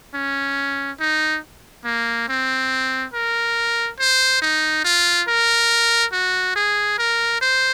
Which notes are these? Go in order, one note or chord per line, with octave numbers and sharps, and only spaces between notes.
C#4
D#4
A#3
C4
A#4
C5
D#4
F4
A#4
F#4
G#4
A#4
C5